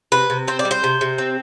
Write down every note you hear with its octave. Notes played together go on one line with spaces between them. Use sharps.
C3 B4
C3
C4 C5
D5
G3
C5
C3
C3
C4